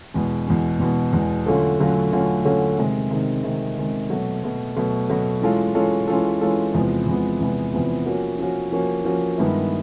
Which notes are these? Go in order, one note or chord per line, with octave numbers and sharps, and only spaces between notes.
E2 B2 G#3
E2 B2 G#3
E2 B2 G#3
E2 B2 G#3
D3 F#3 A3 C#4 F4
D3 F#3 A3 C#4 F4
D3 F#3 A3 C#4 F4
D3 F#3 A3 C#4 F4
C3 D#3 G#3
C3 D#3 G#3
C3 D#3 G#3
C3 D#3 G#3
B2 F#3 A3
B2 F#3 A3
B2 F#3 A3
B2 F#3 A3
E3 G#3 C#4 F4 A4
E3 G#3 C#4 F4 A4
E3 G#3 C#4 F4 A4
E3 G#3 C#4 F4 A4
E2 C3 F3 G#3 B3
E2 C3 F3 G#3 B3
E2 C3 F3 G#3 B3
E2 C3 F3 G#3 B3
F3 A#3 C#4 F#4
F3 A#3 C#4 F#4
F3 A#3 C#4 F#4
F3 A#3 C#4 F#4
G2 D#3 G#3 B3 E4